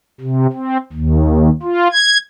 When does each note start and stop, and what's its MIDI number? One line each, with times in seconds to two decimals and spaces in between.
0.20 0.46 48
0.52 0.77 60
0.93 1.50 39
1.63 1.88 65
1.92 2.18 92